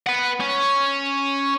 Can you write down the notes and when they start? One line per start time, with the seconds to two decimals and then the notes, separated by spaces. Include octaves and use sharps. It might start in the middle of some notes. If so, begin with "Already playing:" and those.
0.07 B4 F#5
0.41 C#4